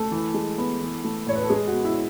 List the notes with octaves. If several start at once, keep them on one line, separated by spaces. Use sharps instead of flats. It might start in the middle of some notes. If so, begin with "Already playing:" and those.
Already playing: A3 A4
E3
G#3
B3
E3
A3
A2 C#5
B4
A4
G#3 G#4
F#4
B3
E4